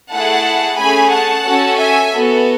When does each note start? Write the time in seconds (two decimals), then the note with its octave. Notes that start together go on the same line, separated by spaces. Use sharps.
0.12 A3 E4 G#4 F#5 A5
0.78 A3 C#4 G#4 G#5 B5
1.11 F#5 A5
1.44 C#4 F#4 A4
1.77 E5 G#5
2.10 B3 F#4 A4